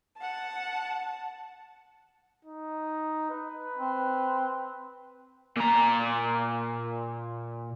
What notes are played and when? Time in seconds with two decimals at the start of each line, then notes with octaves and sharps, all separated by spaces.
0.21 F#5 A5
2.45 D#4
3.30 B4
3.78 C4
5.57 A#2 A#5